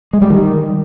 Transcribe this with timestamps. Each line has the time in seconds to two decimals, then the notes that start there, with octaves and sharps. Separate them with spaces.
0.13 G#3
0.22 G3
0.30 D#3